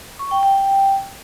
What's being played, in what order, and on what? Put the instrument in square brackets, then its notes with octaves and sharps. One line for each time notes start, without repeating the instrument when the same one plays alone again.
[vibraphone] C#6
G5
G5